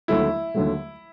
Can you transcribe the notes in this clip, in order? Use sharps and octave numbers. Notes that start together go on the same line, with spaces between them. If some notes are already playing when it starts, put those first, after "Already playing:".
D#2 D3 F#3 A3 E4
D#2 D3 F#3 A3